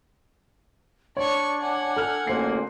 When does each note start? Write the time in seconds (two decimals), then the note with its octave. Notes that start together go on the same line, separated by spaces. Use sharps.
1.17 D4 C#5 D5 C#6
1.61 F#5 G#5
1.96 A4 F6 F#6
2.27 A1 D2 A#3 C5 C7